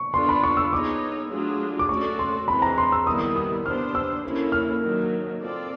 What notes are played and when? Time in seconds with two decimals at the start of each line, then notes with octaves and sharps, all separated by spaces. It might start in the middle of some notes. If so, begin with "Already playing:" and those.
Already playing: C#6
0.14 B3 D4 F4 A4 D5 C6
0.29 B5
0.43 C#6
0.57 E6
0.73 B3 D#4 G#4 C#5 D6
1.30 F#3 A3 D4 F4 G#4
1.79 D6
1.89 A3 C#4 F#4 A4 D5 C#6
2.19 C6
2.47 E3 G#3 C4 B5
2.62 A#5
2.78 C6
2.92 E6
3.06 D#3 G3 B3 E4 D#6
3.21 D#6
3.36 D#6
3.65 B3 D4 G4 C5 F6
3.95 E6
4.24 A#3 C#4 E4 A4
4.52 F6
4.82 D#3 F#3 A#3
5.40 C4 F4 A4 D5